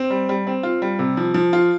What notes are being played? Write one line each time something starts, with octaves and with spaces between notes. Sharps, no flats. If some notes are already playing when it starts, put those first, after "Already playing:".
Already playing: C4
G3
G3
C4
F4
G3
C3
F3
F3
F4